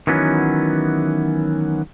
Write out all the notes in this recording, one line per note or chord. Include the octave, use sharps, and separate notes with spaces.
D#3 E3 F#3 B3 C#4